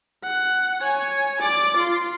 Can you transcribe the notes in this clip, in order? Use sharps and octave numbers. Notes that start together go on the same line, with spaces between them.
F#5
C#5 G#5
D5 D6
F4 C6